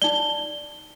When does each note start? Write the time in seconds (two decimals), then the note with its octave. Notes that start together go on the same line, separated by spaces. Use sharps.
0.02 D#4 D5 G7